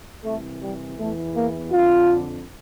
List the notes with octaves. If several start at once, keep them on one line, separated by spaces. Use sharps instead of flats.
C2 C3 E3 A3
G3
E2 E3 A3
A#3
F2 D3 F4